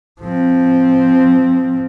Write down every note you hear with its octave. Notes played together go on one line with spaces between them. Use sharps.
F3 C4